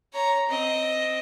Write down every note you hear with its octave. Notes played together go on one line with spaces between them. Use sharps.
C#5 A#5
C4 D#5